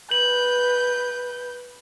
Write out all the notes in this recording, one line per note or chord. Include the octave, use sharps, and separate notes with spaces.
B4 G6 F#7